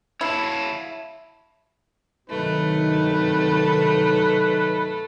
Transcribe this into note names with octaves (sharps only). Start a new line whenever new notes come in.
E4 C#5 F5 A5
G2 C3 D#3 F#3 A3 D#4 B4